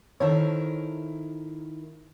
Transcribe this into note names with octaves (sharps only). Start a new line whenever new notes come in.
D#3 E4 A4 A#4 C5 C#5